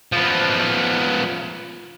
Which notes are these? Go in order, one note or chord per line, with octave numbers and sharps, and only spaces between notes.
F3 B3